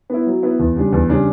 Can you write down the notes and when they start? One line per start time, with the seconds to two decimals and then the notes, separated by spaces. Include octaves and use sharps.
0.10 B3 E4
0.26 F#3
0.43 B3 E4
0.59 E2
0.76 C#3 G3 D4
0.92 E2
1.09 C#3 G3 D4